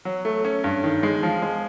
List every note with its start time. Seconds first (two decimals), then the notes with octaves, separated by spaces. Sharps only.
0.05 F#3
0.25 A3
0.45 C#4
0.64 G2
0.84 D#3
1.03 G#3
1.23 F3
1.42 G#3